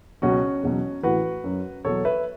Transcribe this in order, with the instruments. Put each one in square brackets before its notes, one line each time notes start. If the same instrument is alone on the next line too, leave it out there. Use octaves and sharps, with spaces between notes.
[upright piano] C#2 B2 F#3 C#4 F#4
E2 B2 F#3
A2 E3 F#4 B4
F#2 F#3
E2 B2 F#3 A4 C#5
B4 E5